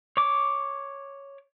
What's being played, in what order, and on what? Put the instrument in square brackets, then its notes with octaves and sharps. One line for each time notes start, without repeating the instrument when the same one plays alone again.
[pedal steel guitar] C#5 D6